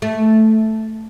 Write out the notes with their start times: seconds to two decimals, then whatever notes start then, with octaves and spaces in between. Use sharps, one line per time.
0.02 A3